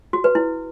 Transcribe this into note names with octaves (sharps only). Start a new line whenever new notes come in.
F#4
B4
E4